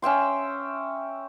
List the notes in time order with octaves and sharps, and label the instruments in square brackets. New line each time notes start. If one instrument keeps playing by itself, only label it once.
[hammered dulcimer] C#4 E5 G5 C6